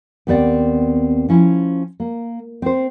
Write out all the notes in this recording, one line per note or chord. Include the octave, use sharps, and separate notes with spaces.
D#2 B3 C4 D5 F#5
F3 C#4 E4
A#3
C4 C5